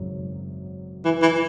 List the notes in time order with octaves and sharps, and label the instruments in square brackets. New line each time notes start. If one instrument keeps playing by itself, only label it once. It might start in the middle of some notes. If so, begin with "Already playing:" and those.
Already playing: [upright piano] G#1 F#2 C#3 F#3
[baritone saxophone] E3
E3